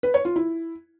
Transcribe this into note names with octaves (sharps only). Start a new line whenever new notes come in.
B4
C#5
F4
E4